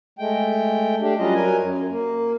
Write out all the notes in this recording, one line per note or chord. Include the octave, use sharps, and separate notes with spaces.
G#3 A3 G5
A3 D4 G4
F#3 G3 C#4 F4 D#5
F#3 A#4 G#5
F#2
A#3